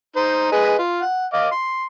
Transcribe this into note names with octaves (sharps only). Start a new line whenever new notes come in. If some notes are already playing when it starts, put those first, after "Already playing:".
D#4 C5
G#4 B4 D#5
F4
F#5
D#5 F5 D6
C6